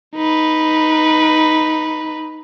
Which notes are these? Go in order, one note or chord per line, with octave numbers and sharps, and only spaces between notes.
D#4 B4